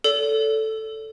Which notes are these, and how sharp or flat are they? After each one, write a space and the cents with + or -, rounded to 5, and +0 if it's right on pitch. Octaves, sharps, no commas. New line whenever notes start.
A4 +0 D5 -45